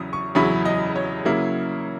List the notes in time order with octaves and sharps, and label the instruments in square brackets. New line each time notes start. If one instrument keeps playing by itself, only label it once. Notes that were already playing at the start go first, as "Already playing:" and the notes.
Already playing: [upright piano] E2 C#3 F#3 E4 D#6
C#6
E2 C#3 F#3 C#4 E4 B5
D#5
C#5
C#3 F#3 A#3 E4